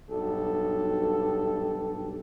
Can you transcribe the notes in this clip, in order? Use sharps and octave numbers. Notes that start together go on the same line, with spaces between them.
B1 G2 G4 A4